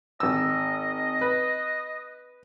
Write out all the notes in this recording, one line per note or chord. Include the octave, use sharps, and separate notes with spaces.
G#1 D#5 E6
B4